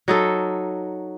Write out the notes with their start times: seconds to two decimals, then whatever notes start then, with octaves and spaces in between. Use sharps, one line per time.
0.08 F#3 D#4 A4